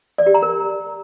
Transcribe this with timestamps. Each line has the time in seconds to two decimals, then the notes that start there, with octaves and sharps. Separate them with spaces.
0.18 D5
0.26 G4
0.34 A#5
0.42 A#4